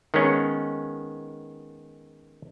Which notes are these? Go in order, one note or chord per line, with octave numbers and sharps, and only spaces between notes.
D#3 G#3 B3 C#4